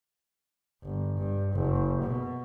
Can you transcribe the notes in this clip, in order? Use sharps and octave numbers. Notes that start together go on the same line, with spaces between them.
G1
G2
F#1
B2